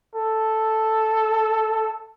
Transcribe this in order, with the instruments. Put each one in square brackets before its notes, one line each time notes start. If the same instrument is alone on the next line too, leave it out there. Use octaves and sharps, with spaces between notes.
[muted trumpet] A4